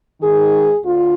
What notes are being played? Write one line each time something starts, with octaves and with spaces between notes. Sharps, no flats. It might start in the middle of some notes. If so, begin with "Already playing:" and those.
G#2 D#3 G#4
D2 D3 F4